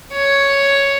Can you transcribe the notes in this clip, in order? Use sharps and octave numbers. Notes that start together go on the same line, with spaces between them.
C#5